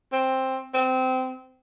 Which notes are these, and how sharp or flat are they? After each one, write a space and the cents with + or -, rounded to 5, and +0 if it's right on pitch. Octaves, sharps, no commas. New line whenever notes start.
C4 +10
C4 -20